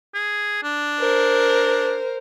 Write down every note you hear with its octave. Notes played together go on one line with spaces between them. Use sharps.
G#4
D4
A#4 C5